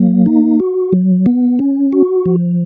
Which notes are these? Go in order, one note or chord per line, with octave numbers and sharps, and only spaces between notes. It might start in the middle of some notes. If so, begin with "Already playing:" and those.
Already playing: F#3 A#3
D#4
F#4
F#3
B3
C#4
F#4
F3